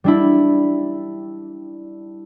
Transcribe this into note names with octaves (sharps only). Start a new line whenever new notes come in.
G3 D4 E4